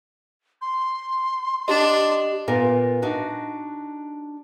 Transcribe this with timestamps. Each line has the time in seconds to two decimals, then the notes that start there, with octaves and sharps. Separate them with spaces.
0.62 C6
1.68 D4 G4 D#5
2.48 A#2 B3 F4 A#4
3.02 D4 D#4 F#4